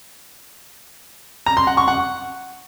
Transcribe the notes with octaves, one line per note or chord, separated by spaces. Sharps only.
A#5
C6
F#5
C#6
F#5